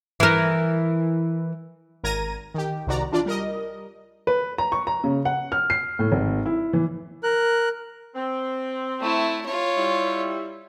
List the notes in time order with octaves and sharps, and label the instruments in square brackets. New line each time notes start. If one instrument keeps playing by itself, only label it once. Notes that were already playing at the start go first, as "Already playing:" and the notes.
[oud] E3 A#4
[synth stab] G#1 A#4 A#5 G#6 A#6 D#7
D#3 G4
C2 C3 D#3 F#4 D5 A#5
E3 D4 F4 D5
G3 A#4 D#5
[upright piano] B4
A#5
C#6
A#5
C#3
F#5
F6
C7
A2
G#1
E4
E3
[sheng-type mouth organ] A#4 F#6
[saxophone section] C4
[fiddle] A3 E4
F4 C#5
[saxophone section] G3 E4